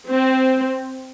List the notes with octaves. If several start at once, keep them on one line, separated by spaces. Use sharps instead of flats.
C4